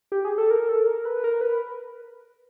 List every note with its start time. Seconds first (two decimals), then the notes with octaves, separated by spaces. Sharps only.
0.12 G4
0.25 G#4
0.38 A4
0.51 A#4
0.69 A4
0.87 A#4
1.05 B4
1.24 A#4
1.41 B4